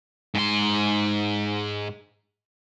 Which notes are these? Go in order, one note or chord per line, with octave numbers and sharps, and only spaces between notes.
G#2 C6